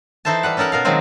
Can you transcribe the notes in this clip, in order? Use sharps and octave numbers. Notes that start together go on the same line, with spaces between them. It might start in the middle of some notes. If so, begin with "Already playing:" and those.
E3 D#4 A4 C5 E5 A5
G3 B4 F#5
C#4 D#4 A4 A#4 F#5
B2 A#4 F5
D#3 F3 F#3 G#3 C4